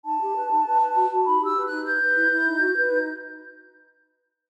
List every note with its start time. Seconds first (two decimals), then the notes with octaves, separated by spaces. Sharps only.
0.04 D#4 A5
0.20 G4
0.35 B4
0.50 D#4
0.65 B4
0.80 B4
0.95 F#4
1.10 F#4
1.26 D#4 B5
1.40 G4
1.45 E6
1.55 B4
1.66 D#4 F#6
1.85 B4 G6
2.01 B4
2.16 E4
2.31 E4
2.46 D#4
2.61 F#4
2.77 B4
2.91 D#4